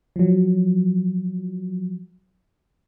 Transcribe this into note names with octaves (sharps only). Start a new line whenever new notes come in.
F3 F#3